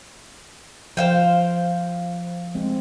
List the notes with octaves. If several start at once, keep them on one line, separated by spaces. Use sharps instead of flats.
F3 C5 F5 G5
G#3 C4